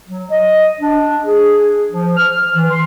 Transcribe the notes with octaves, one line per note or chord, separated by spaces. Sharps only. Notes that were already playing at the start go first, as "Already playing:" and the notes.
F#3
D#5
D4
G#4
F3
F6
E3
C6